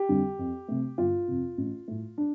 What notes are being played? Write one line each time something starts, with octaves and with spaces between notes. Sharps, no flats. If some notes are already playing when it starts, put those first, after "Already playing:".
Already playing: G4
F2 D3 G3
F2
C3 A3
G1 F4
F2 C3
A1
A2 A3
D4